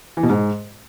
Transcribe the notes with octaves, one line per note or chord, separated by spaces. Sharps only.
E3
B2
G#2